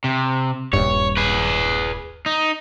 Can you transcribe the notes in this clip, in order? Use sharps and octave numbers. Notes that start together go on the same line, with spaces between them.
C3
D#1 G2 C#5
G#4 B4
D#4